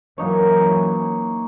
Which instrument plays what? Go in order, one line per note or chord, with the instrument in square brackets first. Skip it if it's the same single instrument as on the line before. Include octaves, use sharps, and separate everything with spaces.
[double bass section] E3 F#3 C#4 [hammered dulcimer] A#3 D#4 C#5